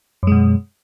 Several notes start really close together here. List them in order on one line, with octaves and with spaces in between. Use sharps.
F#2 G#3 B2